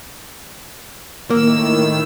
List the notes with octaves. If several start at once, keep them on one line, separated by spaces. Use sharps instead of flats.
A2 D#3 A#3 E6